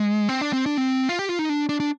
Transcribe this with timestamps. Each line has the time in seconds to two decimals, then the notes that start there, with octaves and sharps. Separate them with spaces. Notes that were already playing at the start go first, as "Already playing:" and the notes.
Already playing: G#3
0.29 C4
0.41 D4
0.53 C4
0.66 D4
0.78 C4
1.09 F4
1.19 G4
1.29 F4
1.39 D#4
1.49 D4
1.69 D4
1.80 D4